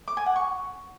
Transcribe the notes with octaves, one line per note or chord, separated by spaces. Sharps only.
D6
G#5
F#5
C#6